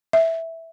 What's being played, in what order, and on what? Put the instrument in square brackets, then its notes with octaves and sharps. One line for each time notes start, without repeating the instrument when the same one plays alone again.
[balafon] E5